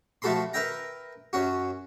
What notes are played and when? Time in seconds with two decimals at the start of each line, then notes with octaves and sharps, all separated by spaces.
0.22 F3 A3 F#4 A4 B5 C6
0.53 A#4 B4 E5 G5 A#5
1.33 F#2 C#4 F#4